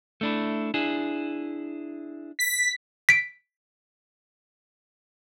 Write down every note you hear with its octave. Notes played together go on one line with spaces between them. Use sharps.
A3 D4 E4
D4 E4 G#4
B6
B6 D7